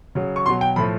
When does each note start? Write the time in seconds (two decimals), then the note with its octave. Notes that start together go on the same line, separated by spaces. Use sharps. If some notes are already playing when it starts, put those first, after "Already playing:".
0.15 C#3 F#3
0.36 C#6
0.46 B2 F#3 C6
0.61 G5
0.76 A2 F3 B5